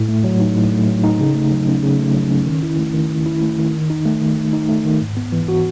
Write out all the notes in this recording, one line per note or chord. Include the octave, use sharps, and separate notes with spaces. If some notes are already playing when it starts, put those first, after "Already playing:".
Already playing: A2
A3
F#3
D#4
A2
A3
F#3
D#4
C#3
A3
F#3
C#4
C#3
A3
F#3
C#4
D#3
E4
A3
D#3
D#3
E4
A3
D#3
D#3
D#4
A3
D#3
D#3
D#4
A3
D#3
G#2
B3
E3
F#4